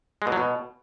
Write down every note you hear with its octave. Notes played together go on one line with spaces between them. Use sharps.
G#3
B2
F#3
B2